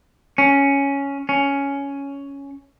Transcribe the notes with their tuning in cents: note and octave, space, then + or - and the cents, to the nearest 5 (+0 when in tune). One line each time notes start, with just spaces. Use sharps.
C#4 +5
C#4 +10